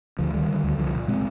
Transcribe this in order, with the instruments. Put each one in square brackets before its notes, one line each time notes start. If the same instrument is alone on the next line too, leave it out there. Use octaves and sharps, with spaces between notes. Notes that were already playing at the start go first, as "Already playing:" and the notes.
[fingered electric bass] D2 D3 F3
D3 D#3 G3
D3
D2
C2 D3 F3
A#2
A#2 G#3 C4